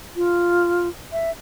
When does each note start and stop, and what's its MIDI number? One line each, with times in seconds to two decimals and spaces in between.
0.16 0.88 65
1.12 1.31 76